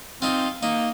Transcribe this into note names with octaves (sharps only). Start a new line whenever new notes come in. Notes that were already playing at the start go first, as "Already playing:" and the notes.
C4 D#4 F4
A#3 D#4